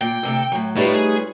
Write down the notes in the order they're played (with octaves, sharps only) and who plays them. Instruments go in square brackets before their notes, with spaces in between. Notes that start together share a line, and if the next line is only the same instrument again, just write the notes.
[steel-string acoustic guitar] A#2 [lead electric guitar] G5
[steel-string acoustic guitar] D2 C3 A4
A2 F#3
[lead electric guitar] A2 [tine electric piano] G3 A3 D#4 [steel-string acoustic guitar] F4 B4 C#5
[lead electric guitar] G#4